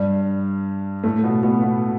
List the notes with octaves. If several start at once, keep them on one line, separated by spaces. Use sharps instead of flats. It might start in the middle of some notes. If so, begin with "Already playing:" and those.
Already playing: G2 G3
A2 A3
B2 B3
B2 B3
B2 B3